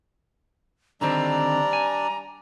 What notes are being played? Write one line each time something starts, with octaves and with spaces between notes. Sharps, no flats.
D3 D#3 G3 C4 D4 D5 A#5
G#5